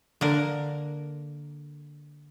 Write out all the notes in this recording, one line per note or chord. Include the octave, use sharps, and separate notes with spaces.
D3 A#3 A#4